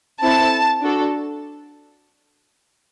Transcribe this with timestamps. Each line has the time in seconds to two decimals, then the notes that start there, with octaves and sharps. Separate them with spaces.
0.22 C4 E4 A4 A5
0.81 D4 F#4 A4